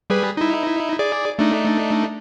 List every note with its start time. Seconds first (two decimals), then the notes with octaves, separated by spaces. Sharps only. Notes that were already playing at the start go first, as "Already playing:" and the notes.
0.10 G3 G#4 B4
0.37 D#4 E4
0.99 G#4 D5
1.39 A3 D4 D#4